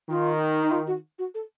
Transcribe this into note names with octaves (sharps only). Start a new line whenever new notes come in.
D#3 F4
D#4
F4
F#4
F#4
A4